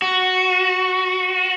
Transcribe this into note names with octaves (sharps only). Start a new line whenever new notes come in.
F#4